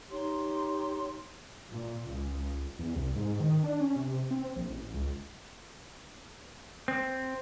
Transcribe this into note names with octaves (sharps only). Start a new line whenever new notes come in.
D#4 G4 C#5 C6
A#2
C#2
E2
C2
G#2
D#3
D4
C#4
C3
C4
A#1
A1
C#2
C4